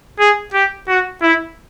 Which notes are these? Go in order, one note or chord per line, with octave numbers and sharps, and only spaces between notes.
G#4
G4
F#4
E4